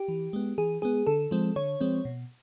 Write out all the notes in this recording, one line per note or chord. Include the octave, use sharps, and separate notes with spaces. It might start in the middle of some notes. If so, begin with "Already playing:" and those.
Already playing: G4
E3
G#3 B3
E3 G#4
G#3 B3 G#4
D3 A4
F3 G#3 C4
D3 C#5
F3 G#3 C4
B2